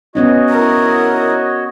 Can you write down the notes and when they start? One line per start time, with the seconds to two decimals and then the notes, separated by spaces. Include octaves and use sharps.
0.15 B3 C#4 D#4 F#4 C#5 D#5
0.50 E4 A#4